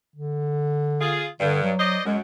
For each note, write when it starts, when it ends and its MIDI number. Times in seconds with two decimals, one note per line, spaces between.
0.15 1.31 50
1.01 1.26 65
1.01 1.26 68
1.40 1.72 43
1.40 1.62 50
1.63 1.98 54
1.80 2.01 72
1.80 2.01 74
1.80 2.01 75
2.05 2.21 42
2.05 2.18 56